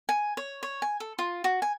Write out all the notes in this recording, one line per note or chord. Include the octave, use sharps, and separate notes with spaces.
G#5
C#5
C#5
G#5
A4
F4
F#4
G#5